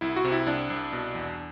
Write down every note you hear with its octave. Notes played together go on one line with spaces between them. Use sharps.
C2 E4
F#4
C3
E4
C2 D4
C2
B2
E2